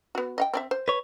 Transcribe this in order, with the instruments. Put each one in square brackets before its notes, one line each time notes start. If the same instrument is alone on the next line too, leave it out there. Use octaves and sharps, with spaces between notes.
[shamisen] B3 F#4
D#5 F5 G5
C4 D5 E5
C5
[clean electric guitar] B4 C#5